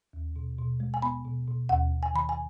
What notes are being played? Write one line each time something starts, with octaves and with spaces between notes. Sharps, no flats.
D#2
B2
B2
G#3
G#5
B3 B5
B2
B2
D#2 F#5
D#2
G#5
D#3 B5
G#5